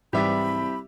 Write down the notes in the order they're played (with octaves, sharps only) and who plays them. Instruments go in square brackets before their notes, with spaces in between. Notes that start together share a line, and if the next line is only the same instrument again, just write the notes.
[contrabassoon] C2 [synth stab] G#2 E3 G3 [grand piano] G4 D5 E5 [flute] B5